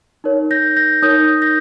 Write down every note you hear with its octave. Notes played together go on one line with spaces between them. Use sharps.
D#4 A#4 C#5
G6 A#6
G6 A#6
D#4 A#4 C#5 D#6 G6
G6 A#6